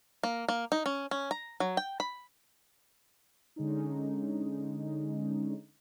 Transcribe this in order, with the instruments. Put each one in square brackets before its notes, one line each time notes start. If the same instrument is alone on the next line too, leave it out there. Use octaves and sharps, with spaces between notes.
[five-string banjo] A#3
A#3
D#4
C#4
C#4
A#5
F#3
G5
B5
[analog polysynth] D3 G#3 C#4 D#4